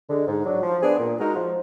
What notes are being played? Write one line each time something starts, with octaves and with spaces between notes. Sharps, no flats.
D3 G#3
G#2
F#3 D4
F3
B3 D4 G#4
A#2
G#3 D#4 F#4 A#4
F3